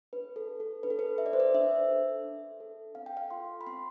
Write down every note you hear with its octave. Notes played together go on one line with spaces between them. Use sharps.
D4 B4
A4
A4
A4
D4 B4
A4
B4
A4 E5
D5
C5
D5
D4 E5
A4
D4
A4
C4 F5
G5
F5
F4 A4 C6
B5
C4 C6